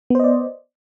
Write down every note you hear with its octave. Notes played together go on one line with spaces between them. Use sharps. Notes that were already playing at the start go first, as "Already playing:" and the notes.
B3 C5 D5 D#5